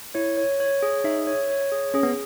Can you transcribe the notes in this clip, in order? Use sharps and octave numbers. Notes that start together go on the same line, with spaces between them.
E4 C#5
C#5
C#5
G#4
D#4 E5
C#5
C#5
G#4
C#4 G#4
B3